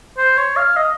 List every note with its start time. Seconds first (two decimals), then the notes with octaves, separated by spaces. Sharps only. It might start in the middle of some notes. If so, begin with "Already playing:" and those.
0.18 C5
0.38 C#5
0.56 F5
0.76 D#5